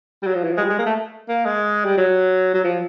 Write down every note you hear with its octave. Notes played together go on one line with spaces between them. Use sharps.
G3
F#3
F3
E3
F3
G#3
G3
G#3
A#3
A3
A#3
G#3
G3
F#3
F#3
F3